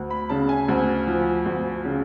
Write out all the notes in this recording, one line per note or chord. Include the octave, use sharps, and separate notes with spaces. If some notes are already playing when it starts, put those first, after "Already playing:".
Already playing: D2
B5
C#3 A5
G#5
D2
F3
D2
C#3